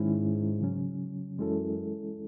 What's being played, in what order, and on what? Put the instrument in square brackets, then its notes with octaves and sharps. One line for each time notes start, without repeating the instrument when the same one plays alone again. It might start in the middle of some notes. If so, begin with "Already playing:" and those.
Already playing: [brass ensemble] G#2 [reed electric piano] D#3 G#3 C#4 E4
[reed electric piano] C#3 F#3 C#4
[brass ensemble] F#2 [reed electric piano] E3 G#3 C#4 E4 A4